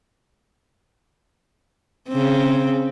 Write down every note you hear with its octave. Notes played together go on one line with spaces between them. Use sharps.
C#3 C4